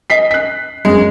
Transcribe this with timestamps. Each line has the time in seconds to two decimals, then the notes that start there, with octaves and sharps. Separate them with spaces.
0.10 D#5 B6 C7
0.31 F#6 B6
0.85 F#2 G#3